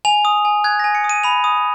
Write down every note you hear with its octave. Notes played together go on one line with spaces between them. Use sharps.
G#5 F7
D#6
G#5
F#6 G#6
G#5 A#6
C#7
D#6
D#7
B5 F7
D#6